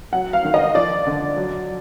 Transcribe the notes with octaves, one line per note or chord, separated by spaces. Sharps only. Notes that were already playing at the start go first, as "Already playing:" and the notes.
F#3 F#5
F5
D#3
D#5
F3 D5
D3
F#3